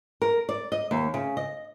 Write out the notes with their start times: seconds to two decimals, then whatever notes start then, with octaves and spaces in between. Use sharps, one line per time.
0.22 A#4
0.49 D5
0.72 D#5
0.91 D#2
1.14 C#3
1.37 D#5